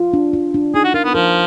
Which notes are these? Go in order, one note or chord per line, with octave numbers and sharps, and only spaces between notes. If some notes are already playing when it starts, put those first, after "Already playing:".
Already playing: F4
D4
F4
D4
D#4 G#4
F#4
F4 A#4
B3
F3 A#4